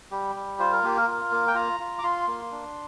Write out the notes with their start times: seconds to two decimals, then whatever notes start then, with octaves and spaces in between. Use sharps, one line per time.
0.11 G3 G4
0.35 G3
0.59 F4 C5
0.72 A#4
0.83 A#3 G4
0.98 A#4
1.07 F4
1.31 A#3
1.48 G5
1.55 F4 A#5
1.80 F4
1.99 D6
2.03 F4 C6
2.27 A#3
2.51 D4